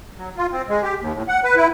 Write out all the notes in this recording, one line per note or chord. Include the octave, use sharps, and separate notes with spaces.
F#3
F4
C4
G#3
G4
D#2
A2
F#5
B4
E4